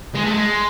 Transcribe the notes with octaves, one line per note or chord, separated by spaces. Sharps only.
G#3
A3
G#3